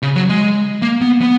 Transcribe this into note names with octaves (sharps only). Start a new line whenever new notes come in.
C#3
F#3
G#3
A#3
B3
B3